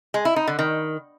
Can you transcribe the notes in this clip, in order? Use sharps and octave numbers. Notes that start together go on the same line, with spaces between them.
G#3
E4
D#4
D3
D#3